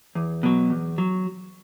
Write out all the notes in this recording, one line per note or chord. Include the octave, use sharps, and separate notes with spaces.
E2
B2 F#3
E2
F#3